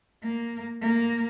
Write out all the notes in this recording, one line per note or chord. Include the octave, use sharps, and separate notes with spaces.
A#3
A#3